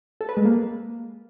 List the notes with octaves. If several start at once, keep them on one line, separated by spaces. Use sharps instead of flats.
A4
B4
G#3
A#3